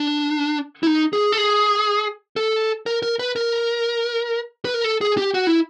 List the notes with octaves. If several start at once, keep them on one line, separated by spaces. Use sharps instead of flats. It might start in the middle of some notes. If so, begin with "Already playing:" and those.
Already playing: D4
E4
D#4
G#4
A4
G#4
A4
A#4
A#4
B4
A#4
B4
A#4
A4
G#4
G4
F#4
E4